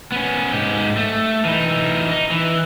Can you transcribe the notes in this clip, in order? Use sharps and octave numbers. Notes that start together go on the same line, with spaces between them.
B3 C#4
G#2 G4
A3
E3 D#4
D#4
E3